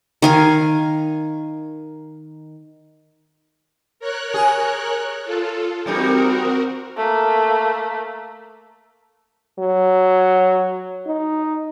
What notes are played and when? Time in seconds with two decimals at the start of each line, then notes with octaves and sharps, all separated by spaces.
0.22 D#3 F5 G#5
4.00 A#4 C#5 F#6
4.34 G#4
5.24 F4 A4
5.86 E2 G3 C4 D#4 F#4 A#4
6.97 A3 A#3
9.59 F#3
11.07 D#4